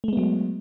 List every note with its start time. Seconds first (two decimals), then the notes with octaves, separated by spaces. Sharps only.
0.04 A3
0.08 G#3
0.13 B3
0.17 F#3